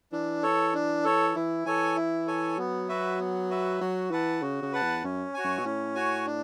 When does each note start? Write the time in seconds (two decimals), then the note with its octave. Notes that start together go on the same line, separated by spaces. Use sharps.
0.12 E3 D4
0.43 A4 C#5
0.74 D4
1.04 A4 C#5
1.35 E3 E4
1.66 E3 A4 C#5 G#5
1.96 E4
2.27 A4 C#5 G#5
2.58 F#3 B3
2.89 F#4 B4 E5
3.19 B3
3.50 F#4 B4 E5
3.81 F#3 F#4
4.11 E3 B4 F#5 A5
4.42 C#3 F#4
4.63 C#3
4.73 B4 F#5 A5
4.83 E2
5.04 F#2 C#4
5.34 F#4 C#5 G#5
5.44 F#2
5.59 B2
5.64 A2 C#4
5.95 F#4 C#5 G#5
6.26 D4